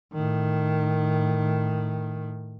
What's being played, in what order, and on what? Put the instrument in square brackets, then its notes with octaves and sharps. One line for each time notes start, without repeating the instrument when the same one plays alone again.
[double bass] A2 D#3